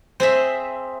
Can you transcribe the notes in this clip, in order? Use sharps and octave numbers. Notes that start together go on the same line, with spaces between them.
C4 G#4 D#5 E5